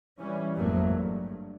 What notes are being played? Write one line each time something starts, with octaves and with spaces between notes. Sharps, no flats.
E3 G3 C#4
G#1 F2 F#3 A3 A#3
G2